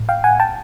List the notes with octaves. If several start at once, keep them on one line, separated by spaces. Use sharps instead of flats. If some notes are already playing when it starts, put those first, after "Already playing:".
Already playing: A2
F5 G5
F#5 G#5
G5 A5